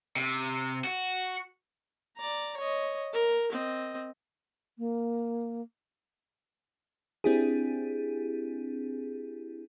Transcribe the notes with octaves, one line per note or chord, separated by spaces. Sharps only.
C3
F#4
D5 A#5
C#5 D#5
A#4
C4 D#5
A#3
C4 D4 E4 G4 G#4